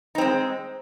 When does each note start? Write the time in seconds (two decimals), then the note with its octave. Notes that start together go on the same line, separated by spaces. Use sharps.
0.15 D#4
0.18 C4
0.21 G#3